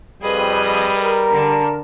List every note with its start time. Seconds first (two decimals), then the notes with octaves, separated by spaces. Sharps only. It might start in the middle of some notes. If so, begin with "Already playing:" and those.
0.22 F2 G3 G#4 B4 D#5
0.94 A#4
1.31 D3 D4 A5